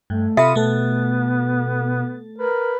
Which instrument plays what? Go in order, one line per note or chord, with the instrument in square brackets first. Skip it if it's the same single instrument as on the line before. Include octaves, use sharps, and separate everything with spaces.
[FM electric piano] G2 [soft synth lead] A3
[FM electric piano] C3 A4 B5 [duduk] F4 [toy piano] E5 [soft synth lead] D#6
[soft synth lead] B2 [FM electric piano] A3 A4 [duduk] B3
[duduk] A#4 [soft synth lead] B4